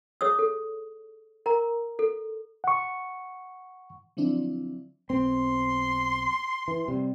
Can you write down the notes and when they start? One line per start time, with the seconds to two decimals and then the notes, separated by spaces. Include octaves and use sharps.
0.21 G#4 C#5 D#6 E6
0.39 A4
1.46 A#4 A#5
1.99 A4
2.64 F#5 C#6
4.17 D3 F3 F#3 C4 D4 E4
5.10 B1 C4 C6
6.68 E3
6.88 C3 G3